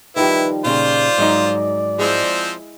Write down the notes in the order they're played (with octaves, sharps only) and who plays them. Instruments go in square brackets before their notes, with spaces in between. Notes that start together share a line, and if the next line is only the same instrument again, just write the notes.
[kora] D#3 F3 G3 [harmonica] E4 [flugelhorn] B4
[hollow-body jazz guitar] A#2 C#3 [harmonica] F4 C5 [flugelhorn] D5
[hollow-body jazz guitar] G#2 F#3 D#4
[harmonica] F3 C4 [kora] G#3 E4